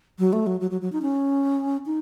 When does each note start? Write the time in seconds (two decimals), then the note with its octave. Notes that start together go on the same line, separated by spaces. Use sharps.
0.19 F#3
0.33 A3
0.47 F#3
0.61 F#3
0.71 F#3
0.81 F#3
0.92 D#4
1.02 C#4
1.86 D#4